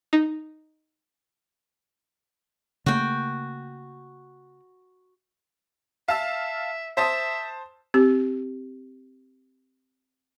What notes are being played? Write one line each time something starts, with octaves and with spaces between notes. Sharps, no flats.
D#4
C#3 A3 A#3 F#4 G5
E5 F5 A5 E6
C5 E5 A5 D#6
C4 G4